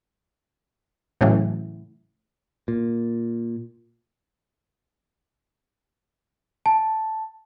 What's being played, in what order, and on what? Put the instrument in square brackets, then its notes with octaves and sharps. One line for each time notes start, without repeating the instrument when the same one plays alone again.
[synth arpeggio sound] A2 C#3 E3 F#3
[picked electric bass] A#2
[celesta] A5